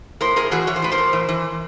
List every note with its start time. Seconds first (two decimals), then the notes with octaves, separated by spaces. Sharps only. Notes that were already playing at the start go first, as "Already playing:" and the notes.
0.21 A2 A#4 C5
0.36 A2 G#4 A#4
0.51 E3 F#4 G#4
0.67 E3 C#5
0.76 C5
0.82 A2 B4
0.92 A#4 C5
0.98 A2
1.13 E3
1.28 E3